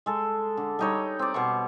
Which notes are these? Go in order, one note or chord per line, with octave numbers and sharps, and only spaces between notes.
G#3 A4
D3
G3 D#4 C#5
C4 D5
B2 B3 C5 C#6